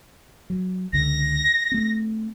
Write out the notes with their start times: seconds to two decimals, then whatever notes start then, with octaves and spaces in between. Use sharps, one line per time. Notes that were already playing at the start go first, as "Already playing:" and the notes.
0.50 F#3
0.93 C#2 D3 A#6
1.72 A3 C4